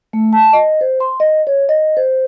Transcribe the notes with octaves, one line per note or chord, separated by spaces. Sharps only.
A3
A5
D#5
C5
C6
D#5
C#5
D#5
C5